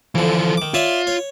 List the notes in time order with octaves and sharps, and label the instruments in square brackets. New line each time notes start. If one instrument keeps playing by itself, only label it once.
[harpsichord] F2 D3 [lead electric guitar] E3 F3
[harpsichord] D#3 D6
[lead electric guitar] F4 [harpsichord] C#5 D5 E5
[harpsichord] C#5